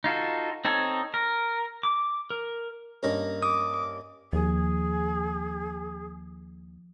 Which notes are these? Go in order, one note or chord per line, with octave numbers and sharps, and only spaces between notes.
D#4 F4 F#4 A4
C4 D#4 A4 C#5
A#4
D6
A#4
G2 A#3 C#4 D#4 A#4
D6 D#6
D#2 F3 G#4